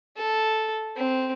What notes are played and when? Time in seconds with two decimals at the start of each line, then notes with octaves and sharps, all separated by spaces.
0.16 A4
0.96 C4